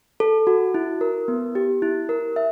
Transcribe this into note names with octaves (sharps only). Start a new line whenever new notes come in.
A4
F#4
E4
A#4
B3
G4
E4
A#4
E5